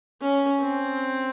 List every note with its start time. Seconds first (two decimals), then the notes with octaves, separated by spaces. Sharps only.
0.21 C#4
0.60 C4